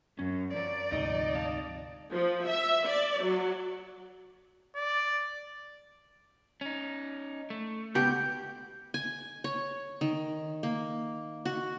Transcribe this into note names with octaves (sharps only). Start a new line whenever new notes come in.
F#2 C#4
F3 A#4 C#5 D5
D2 G#2 C3 D#4
F2 F5 A5
F3
E5
D5
F#3
D5
C#4 D#4
A3
C#2 B2 B3 G4 G6
G#5
C#5
D#3
A#3
F#4